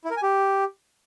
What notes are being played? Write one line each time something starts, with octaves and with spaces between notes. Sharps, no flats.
E4
A#4
G#5
G4